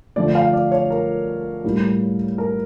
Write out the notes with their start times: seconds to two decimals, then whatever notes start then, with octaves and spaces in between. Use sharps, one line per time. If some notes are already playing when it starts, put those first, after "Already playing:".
0.16 D3 F3 A3 D5
0.35 F5
0.53 D5
0.72 C#5
0.90 A#4
1.64 A2 G3 A#3
2.38 A#4